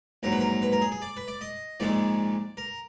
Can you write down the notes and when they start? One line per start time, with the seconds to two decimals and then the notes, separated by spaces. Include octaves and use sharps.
0.23 A#1 G#2 F#3 A#4
0.32 B4
0.40 A#4
0.62 B4
0.72 A#4
0.82 G#4
0.92 G#4
1.02 D5
1.17 B4
1.28 D5
1.41 D#5
1.80 A#1 G#2 D#3 G#3 D5
2.57 A#4